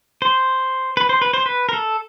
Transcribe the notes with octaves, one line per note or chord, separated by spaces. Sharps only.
C5
B4
C5
B4
C5
B4
A#4
A4